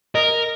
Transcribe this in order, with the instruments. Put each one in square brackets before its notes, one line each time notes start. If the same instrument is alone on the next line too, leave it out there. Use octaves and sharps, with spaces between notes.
[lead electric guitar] A#4 [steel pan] D#5